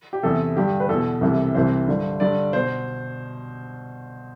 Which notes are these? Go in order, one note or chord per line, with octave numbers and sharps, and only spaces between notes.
G4
E2 C3 E3 A4
G2 D3 G4
B4
E2 B2 A4
C2 C3 E3
C2 C3 E3 C5
G2 D3
G2 D3 D5
B2 C5